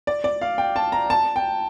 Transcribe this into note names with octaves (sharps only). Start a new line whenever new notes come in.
D5
D5
F5
G5
A5
A#5
A5
G5